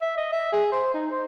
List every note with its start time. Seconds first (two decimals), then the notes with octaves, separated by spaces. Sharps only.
0.02 E5
0.18 D#5
0.32 E5
0.53 G#4
0.72 C5
0.94 D#4
1.11 C5